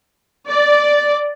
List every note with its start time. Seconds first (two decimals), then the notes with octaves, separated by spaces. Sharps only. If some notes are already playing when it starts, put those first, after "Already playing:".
0.48 D5